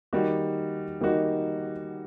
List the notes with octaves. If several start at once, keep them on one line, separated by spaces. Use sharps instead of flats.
D#3 G3 A#3 D#4 F#4
D#3 G3 A#3 D#4 F#4